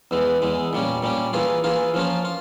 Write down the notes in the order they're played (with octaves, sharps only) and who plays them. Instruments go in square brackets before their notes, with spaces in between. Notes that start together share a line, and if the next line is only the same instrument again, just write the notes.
[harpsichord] E2 E3 G#3
E2 E3 G#3
A#2 G3 C#4
A#2 G3 C#4
E3 A#3 F4 G#4
E3 A#3 F4 G#4
F3 A#3 C#4 F4
F4